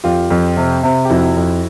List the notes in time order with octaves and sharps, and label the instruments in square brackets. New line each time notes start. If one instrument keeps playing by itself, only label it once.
[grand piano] F2 [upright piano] F4 G4
[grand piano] F2
C3
C3
[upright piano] G4
[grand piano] F2 [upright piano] E4 F#4
[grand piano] F2